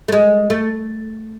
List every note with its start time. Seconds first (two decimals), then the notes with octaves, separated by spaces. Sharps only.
0.08 A3
0.12 G#3
0.50 A3